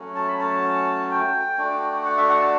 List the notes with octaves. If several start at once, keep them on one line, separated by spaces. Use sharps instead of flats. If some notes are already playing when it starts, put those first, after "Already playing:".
Already playing: F#3 A3 C#4
A5
B5
A5
G5
A3 D4 F#4
F#5
E5
F#5
A5